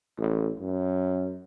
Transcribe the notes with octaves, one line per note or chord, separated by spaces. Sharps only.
A1
F#2